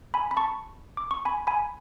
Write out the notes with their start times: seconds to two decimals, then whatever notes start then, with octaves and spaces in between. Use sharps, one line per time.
0.14 G#5 B5
0.31 B5
0.37 A5 C#6
0.97 D6
1.11 C#6
1.25 G#5 B5
1.47 G#5 B5